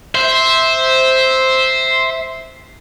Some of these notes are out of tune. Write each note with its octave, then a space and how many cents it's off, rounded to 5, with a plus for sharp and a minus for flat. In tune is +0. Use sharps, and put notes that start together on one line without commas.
C5 +0 E5 -10